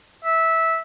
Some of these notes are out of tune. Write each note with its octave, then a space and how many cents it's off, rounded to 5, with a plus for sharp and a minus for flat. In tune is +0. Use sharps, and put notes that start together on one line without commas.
E5 -15